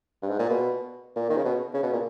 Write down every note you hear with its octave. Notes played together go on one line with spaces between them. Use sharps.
G2
G#2
A#2
B2
A#2
D#3
C#3
B2
C#3
B2
A#2